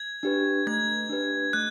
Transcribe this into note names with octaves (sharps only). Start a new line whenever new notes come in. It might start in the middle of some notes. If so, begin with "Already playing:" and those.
Already playing: G#6
D4 G4 B4
A3 G#6
D4 G4 B4
A3 F#6